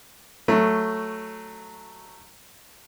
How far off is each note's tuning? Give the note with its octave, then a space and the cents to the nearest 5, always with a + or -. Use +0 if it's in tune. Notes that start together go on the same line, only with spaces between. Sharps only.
F#3 +0 A3 +5